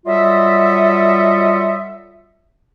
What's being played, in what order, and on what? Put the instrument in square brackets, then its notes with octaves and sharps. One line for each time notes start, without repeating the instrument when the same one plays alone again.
[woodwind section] F#3 G3 F4 A4 D#5 E5